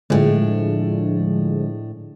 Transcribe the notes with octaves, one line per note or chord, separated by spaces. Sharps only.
A2 D3 F3 G#3 D4